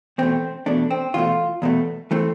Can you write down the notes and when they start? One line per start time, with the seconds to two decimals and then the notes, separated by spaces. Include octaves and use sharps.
0.18 E2 B2 A3 C4
0.66 E2 B2 A3 D4
0.91 C4
1.14 E2 B2 A3 F4
1.62 E2 B2 A3
2.11 E3 A3 C4